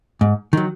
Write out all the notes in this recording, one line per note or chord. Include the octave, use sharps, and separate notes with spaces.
G#2
D#3 F#3